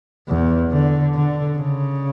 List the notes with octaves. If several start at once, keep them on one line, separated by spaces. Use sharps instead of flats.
E2
D3
D3
C#3